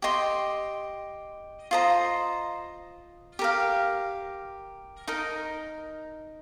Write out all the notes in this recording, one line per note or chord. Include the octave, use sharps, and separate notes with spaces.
G4 D#5 C6
F4 C5 D#5 A#5
G4 A#4 F5
D#4 A#4 D#5